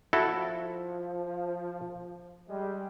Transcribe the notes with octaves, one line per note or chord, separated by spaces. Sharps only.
F3 E4 F#4 A4
G3 G#3